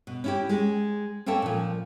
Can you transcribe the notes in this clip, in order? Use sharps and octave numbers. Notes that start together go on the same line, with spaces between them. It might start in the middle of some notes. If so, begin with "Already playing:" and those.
B2
C#4 E4 G4
G#3
A#3 C#4 A4 E5 G5 A5
A#2 F3